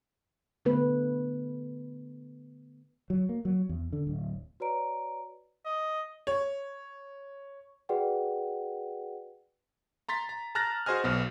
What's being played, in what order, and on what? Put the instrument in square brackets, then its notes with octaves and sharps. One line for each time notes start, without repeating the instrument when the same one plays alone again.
[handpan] D3 A3 B3 B4
[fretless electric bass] F#3
A#3
F#3
E2
D3
D1
[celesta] F#4 B4 C#5 D5 A#5 D7
[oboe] D#5
[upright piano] C#5
[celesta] F#4 G#4 B4 D5 F#5 G5
[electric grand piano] A#5 C6 A6 B6
A#5
A5 A#5 F6 F#6 A6 A#6
F#4 G#4 C5 D#5 G#5 F6
B1 B2 B3